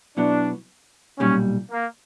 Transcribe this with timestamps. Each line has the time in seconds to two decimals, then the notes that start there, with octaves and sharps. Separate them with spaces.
0.17 B2 F#3 B3 D4 E4
1.19 B1 A#2 G3 C#4
1.71 A#3